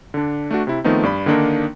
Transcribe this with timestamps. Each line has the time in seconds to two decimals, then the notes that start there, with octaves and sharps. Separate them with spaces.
0.14 D3 D4
0.51 A3 D4 F#4
0.67 C3 E4
0.84 D#3 F3 A3 B3 C4 D#4
1.03 G2 D5 B5
1.26 D3 D#3 A#3 D4 D#4 A#4